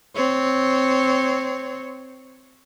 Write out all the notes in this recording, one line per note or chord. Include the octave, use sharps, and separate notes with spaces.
C4 C#5